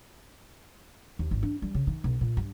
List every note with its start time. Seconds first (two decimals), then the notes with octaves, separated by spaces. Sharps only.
1.19 D#2
1.31 G#1
1.43 D4
1.62 G3
1.74 C#3
1.87 D#3
2.04 B1
2.21 A#2
2.37 G2